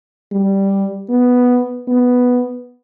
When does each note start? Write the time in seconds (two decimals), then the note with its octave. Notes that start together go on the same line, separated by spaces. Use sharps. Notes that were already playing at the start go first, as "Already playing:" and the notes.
0.32 G3
1.10 B3
1.88 B3